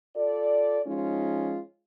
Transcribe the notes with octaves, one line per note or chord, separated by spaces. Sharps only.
F4 A4 D5
F3 G#3 C#4 D#4 F4